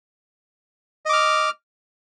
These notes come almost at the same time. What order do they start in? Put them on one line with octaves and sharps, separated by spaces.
D#5 D6 F6